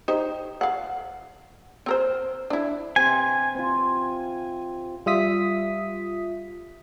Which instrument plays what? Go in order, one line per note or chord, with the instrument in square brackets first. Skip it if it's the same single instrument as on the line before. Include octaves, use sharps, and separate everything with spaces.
[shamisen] D#4 G4 C5
F5 F#5
C4 A#4 C5
D4 E4
[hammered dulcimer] C3 [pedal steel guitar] G#5
[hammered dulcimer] C4 F4
[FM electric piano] G3 F4 E5 D#6 B6